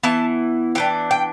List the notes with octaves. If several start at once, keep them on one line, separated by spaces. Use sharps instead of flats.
E3 B3 E4 A5
E3 B3 D4 G5
G5